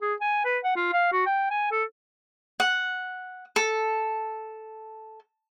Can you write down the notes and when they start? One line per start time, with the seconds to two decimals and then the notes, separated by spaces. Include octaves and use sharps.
0.02 G#4
0.21 G#5
0.45 B4
0.64 F#5
0.76 F4
0.93 F5
1.12 F#4
1.26 G5
1.51 G#5
1.71 A4
2.60 F#5
3.56 A4